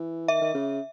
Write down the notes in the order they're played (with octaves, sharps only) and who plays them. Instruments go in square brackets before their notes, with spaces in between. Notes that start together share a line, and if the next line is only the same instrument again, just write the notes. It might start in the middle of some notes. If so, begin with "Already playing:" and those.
Already playing: [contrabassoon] E3
[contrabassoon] D#3 [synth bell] E5
[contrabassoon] D#3
C#3